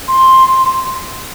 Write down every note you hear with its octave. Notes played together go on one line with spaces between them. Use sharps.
C6